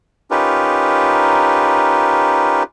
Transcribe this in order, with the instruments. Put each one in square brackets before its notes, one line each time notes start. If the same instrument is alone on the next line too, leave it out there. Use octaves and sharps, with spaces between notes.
[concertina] C#4 D#4 F4 G4 A#4 B4